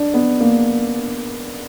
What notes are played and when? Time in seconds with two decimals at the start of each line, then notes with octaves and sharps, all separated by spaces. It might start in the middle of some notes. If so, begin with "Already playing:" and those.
Already playing: D4
0.14 B3
0.41 A#3